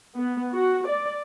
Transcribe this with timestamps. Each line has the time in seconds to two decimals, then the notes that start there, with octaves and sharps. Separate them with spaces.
0.16 B3
0.54 F#4
0.89 D5